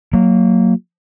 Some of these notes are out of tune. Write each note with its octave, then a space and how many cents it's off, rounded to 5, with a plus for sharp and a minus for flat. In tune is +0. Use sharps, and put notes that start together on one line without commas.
F#3 -5 A#3 -15